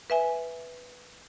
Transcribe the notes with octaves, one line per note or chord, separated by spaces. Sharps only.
B4 E5 G#5